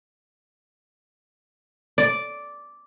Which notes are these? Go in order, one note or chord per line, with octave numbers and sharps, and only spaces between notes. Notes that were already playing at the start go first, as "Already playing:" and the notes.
D5